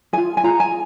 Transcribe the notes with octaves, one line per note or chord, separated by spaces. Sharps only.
F4 G#4 G#5
G#5
F4 G#4 A#5
G#5